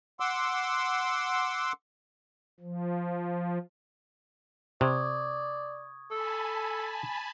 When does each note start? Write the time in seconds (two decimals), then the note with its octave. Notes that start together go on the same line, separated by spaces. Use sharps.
0.20 F#5 C6 D6 E6
2.60 F3
4.81 C3 D5 C#6 D#6 G#6
6.11 A4 G#5 A5 B5